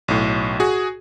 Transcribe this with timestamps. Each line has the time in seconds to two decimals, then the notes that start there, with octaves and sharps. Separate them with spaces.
0.08 B1 A2
0.60 F#4 G#4